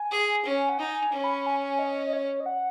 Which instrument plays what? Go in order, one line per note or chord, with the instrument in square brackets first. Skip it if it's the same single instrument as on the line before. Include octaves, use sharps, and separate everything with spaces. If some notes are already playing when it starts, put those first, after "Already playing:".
Already playing: [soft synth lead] G#5
[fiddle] G#4
C#4
[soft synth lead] F#5
[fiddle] D#4 [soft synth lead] G#5
[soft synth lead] G#5
[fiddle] C#4
[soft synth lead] B5
G#5
D#5
D#5
C#5
D#5
F#5